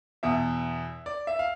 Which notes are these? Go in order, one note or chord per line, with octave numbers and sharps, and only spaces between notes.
E2 B2 E5
D5
E5
F5